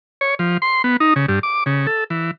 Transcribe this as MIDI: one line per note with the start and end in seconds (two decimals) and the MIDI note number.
0.21 0.35 73
0.39 0.57 53
0.62 0.82 84
0.84 0.97 59
1.00 1.14 63
1.16 1.26 49
1.28 1.39 43
1.43 1.64 86
1.66 1.87 49
1.87 2.04 69
2.10 2.31 52